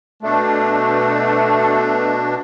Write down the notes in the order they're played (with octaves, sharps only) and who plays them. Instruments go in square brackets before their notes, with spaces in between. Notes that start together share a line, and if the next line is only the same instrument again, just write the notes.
[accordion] B2 D4 [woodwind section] A3